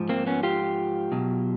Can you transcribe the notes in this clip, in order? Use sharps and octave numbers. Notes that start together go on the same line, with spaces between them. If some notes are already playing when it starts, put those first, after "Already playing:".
Already playing: G#2 F3
A#3 C4
B3 C#4
F4 G4
B2 F#3